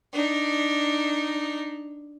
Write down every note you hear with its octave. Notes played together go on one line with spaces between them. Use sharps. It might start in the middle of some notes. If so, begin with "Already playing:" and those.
D4 D#4